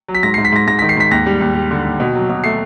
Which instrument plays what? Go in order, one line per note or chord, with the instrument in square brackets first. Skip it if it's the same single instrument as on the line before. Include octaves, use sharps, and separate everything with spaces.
[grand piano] F#3
B6
G#2 A#6
C7
G#2
B6
G#2 A#6
G#2 A#6
B6
D#3
C7
G#2 B6
D#2 A#6
G3
D#2
G3
D3
D#2
B2
F#3
B2
A3 C7